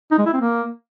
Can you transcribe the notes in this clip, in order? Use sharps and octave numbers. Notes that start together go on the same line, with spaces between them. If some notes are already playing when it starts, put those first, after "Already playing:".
D#4
G#3
E4
C4
A#3